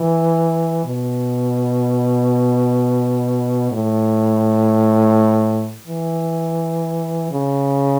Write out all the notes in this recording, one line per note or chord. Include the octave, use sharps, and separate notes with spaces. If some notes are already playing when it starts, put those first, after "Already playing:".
Already playing: E3
B2
A2
E3
C#3